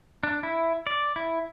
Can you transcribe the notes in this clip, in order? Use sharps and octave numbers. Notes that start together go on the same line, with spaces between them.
D4
E4
D5
E4